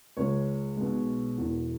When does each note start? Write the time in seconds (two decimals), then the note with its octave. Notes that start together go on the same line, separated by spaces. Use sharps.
0.17 C#2 C#3 G#3 C#5
0.76 B1 B2 G#3
1.38 E1 E2 E3